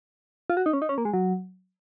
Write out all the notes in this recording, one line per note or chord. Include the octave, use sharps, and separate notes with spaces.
F4
F#4
D#4
C#4
D#4
C#4
A#3
G#3
F#3